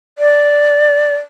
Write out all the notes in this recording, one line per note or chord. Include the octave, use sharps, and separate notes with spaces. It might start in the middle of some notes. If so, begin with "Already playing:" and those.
D5